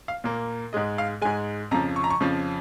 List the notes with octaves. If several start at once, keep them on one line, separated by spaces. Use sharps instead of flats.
F5
A#2 A#3
G#2 G#3 D#5
F5
G#2 G#3 G#5
F2 C#3 F3 A#5
C#6
A#5
C#6
F2 C#3 F3